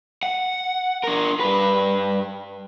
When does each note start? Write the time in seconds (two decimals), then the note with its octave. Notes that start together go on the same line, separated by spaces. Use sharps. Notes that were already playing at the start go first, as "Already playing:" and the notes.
0.23 F#5
1.04 D4 A#4
1.40 G2 B4